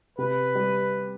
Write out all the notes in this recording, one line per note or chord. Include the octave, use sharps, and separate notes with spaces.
C3 B4
G3